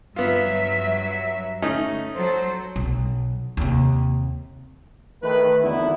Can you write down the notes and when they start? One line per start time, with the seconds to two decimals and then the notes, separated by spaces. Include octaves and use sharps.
0.16 G2 F#3 B3 F4 E5
1.62 A3 C#4 D#4
2.16 F#3 A4 C5
2.76 B1
3.57 D#2 C3
5.23 D#3 A3 B4
5.63 G#1 E2 D3 B3 D#4 E4